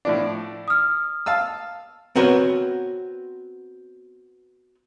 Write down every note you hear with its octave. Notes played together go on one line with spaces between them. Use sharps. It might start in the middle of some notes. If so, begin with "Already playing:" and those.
A2 F3 D4
D#6 F6
F5 A5 E6
B3 C4 F#4 A#4 B4 C#5